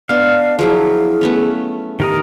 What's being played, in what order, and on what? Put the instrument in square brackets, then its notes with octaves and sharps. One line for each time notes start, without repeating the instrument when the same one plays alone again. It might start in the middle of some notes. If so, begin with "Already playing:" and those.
[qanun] B3 D4 [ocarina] D5 [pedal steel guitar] F5
[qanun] F3 F#3 E4 [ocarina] G#4
[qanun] A3 B3 C#4
[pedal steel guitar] D#3 A#4 D#5 [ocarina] G4